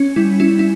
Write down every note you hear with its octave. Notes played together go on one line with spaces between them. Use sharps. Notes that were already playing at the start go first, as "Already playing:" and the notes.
Already playing: C#4
G3 E4
C#4 E4
E4